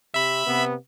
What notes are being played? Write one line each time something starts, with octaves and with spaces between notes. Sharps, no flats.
C3 E5 B5
C3 B3